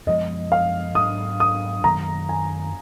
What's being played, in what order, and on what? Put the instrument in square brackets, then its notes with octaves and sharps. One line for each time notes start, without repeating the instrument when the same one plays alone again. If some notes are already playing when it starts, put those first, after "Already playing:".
[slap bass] F#2 F3 G#3 B3 [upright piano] D#5
[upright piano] F5
[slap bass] G#2 F#3 D4 [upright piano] D#6
[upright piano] D#6
[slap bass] F#2 D#3 F#3 A#3 [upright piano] A#5
[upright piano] G#5